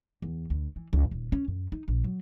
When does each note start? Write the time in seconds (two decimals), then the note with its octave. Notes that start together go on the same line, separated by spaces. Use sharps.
0.22 E2
0.50 D2
0.76 E3
0.93 C#2
1.11 D#1
1.32 C#4
1.48 F#2
1.72 D#4
1.88 A#1
2.04 F#3